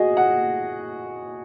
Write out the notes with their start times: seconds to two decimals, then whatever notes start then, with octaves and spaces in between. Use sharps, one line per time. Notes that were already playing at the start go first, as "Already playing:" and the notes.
Already playing: F#4 G#4 D#5
0.17 F#5